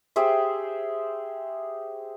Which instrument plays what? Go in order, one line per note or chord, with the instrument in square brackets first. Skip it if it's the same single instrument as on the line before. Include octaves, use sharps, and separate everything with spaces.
[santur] G4 G#4 C5 E5